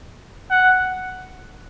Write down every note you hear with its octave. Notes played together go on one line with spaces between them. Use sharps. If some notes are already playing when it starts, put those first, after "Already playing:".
F#5